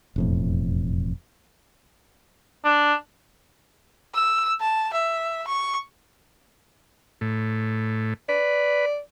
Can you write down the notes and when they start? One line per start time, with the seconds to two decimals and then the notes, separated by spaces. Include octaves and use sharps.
0.16 E1 F2 A2
2.65 D4
4.15 E6
4.61 A5
4.93 E5
5.48 C#6
7.21 A2
8.29 B4 D5